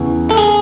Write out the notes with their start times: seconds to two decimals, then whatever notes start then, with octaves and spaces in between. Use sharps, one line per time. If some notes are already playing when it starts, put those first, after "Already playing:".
Already playing: E2 C#3 E3
0.31 A4
0.37 G#4